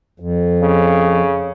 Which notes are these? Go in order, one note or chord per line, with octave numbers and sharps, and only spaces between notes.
F2
C#3